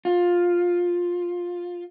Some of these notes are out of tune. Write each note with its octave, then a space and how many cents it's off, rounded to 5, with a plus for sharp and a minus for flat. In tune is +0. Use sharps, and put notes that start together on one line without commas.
F4 +10